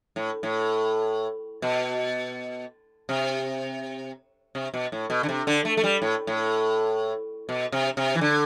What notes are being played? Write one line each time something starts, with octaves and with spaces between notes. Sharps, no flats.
A2
A2
B2
C3
C3
B2
A2
B2
D3
C3
D3
A3
A3
G3
A2
A2
B2
C3
C3
E3
D3